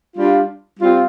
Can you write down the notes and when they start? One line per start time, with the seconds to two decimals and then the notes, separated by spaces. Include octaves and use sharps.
0.17 G3 D4 F4
0.80 G3 C4 F4